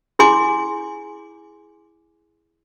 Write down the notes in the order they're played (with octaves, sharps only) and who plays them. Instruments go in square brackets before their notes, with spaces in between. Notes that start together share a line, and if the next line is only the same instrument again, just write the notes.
[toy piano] E4 G#4 G#5 C6 D6